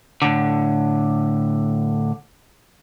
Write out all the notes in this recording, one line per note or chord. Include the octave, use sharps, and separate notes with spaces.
A2 D3